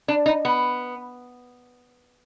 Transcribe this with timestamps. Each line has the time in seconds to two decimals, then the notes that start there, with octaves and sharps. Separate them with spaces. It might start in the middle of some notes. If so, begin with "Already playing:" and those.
0.08 D4
0.26 D#4
0.45 B3